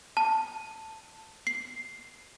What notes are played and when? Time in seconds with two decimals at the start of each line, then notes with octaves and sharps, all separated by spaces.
0.17 A5
1.47 C7